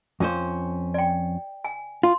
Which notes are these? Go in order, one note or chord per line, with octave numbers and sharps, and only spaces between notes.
F2 C#4 C5
D5 G5
G#5
F4 C6